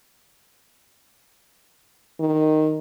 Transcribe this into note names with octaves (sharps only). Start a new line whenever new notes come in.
D#3